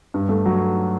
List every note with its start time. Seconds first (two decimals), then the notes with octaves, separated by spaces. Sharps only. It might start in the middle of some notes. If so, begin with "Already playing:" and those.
0.14 G2
0.29 A3
0.46 F#3